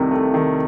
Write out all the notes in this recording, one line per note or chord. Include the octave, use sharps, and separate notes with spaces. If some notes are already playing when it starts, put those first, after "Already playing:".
Already playing: C2 C3 D#3 A3
A3
D#3